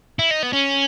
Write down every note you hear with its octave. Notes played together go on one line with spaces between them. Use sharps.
E4
D#4
B3
C#4